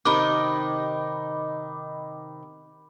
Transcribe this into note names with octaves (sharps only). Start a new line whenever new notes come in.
C3 D#3 D#4 B5 D6